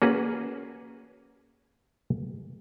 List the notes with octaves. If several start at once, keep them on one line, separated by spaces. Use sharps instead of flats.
A#3 C#4 F#4 G#4 B4 F#5